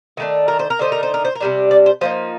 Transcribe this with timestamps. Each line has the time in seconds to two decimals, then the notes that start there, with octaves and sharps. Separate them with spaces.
0.17 D#3 A3 D4
0.48 A#4
0.59 C5
0.70 A#4
0.79 D3 A3 D#4 C5
0.92 A#4
1.03 C5
1.14 A#4
1.25 C5
1.35 A#4
1.40 C3 G3 D4
1.71 D5
1.86 C5
2.01 F3 A#3 D#4 C5